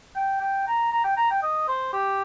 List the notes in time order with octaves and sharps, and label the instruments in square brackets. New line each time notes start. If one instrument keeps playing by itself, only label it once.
[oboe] G5
G5
A#5
A#5
G5
A#5
G5
D#5
C5
G4